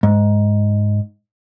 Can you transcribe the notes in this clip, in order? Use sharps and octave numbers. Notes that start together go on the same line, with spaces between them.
G#2